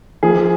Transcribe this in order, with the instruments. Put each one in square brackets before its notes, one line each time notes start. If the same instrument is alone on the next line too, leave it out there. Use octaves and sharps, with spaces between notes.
[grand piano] F3 G#4